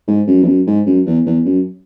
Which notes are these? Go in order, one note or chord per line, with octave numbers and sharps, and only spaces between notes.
G#2
F#2
E2
F#2
G#2
F#2
E2
E2
F#2